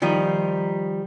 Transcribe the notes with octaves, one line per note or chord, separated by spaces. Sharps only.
D#3 F3 G3 D#4